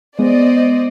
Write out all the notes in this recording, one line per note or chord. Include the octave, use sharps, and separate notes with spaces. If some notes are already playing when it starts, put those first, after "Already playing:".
G#3 B3 C5 D5 D#5